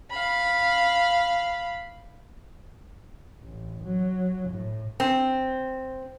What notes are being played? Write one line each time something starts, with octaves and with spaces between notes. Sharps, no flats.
F5 B5
A1
F#3
A2
C4